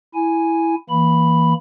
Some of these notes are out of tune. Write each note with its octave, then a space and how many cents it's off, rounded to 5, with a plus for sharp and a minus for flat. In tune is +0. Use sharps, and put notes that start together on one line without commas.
E4 +0 G#5 +0
E3 -10 A#3 +0 B5 +0